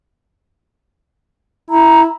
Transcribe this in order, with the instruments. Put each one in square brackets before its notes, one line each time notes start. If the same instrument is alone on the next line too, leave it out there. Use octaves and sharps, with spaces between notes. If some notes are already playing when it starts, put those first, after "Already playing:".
[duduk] E4 [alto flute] A#5